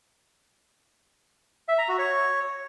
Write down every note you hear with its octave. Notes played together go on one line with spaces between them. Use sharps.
E5
A#5
F#4
C#5